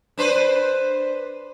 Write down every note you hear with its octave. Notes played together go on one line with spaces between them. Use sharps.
D4 B4 C5